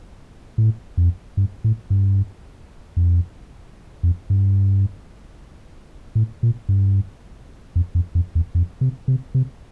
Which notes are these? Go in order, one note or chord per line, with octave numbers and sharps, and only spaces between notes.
A2
F2
G2
A2
G2
F2
F2
G2
A2
A#2
G2
F2
F2
F2
E2
F2
C3
C3
C3